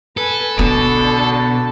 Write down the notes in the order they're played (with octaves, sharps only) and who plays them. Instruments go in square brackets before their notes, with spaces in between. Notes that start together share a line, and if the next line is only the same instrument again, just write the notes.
[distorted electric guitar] A4 [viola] B4 G#5
[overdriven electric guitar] B2 [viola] D3 A5 [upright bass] B3